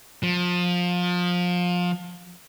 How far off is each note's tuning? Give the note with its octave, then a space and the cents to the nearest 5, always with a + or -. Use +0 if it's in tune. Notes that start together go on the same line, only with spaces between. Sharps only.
F3 +25